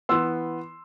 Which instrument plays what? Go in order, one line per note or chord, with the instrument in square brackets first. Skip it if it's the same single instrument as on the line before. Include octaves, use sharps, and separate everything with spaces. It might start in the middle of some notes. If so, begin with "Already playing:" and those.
[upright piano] E3 B3 C6 E6